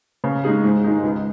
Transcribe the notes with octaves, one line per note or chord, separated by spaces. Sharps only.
C#3
G#3 D#4 G#4
G#2
D#3 G#3 D#4
C#2